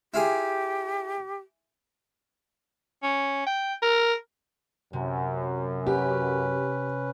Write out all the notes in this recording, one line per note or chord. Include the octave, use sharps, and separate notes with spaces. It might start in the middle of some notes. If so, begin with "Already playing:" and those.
E4 F4 G4 G#4
C#4
G5
A#4
F#2 C3
C#4 G4 B4